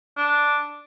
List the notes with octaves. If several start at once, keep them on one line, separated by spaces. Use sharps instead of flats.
D4